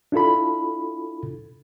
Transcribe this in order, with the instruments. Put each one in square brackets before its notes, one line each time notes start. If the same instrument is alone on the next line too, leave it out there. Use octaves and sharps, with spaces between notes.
[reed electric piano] D4 E4 F4 A4 B5